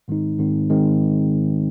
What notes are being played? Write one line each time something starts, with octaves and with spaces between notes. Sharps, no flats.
G#2 D#3 G#3 C4 D#4
G#2 D#3 G#3 C4 D#4
D#3 G#3 C4 D#4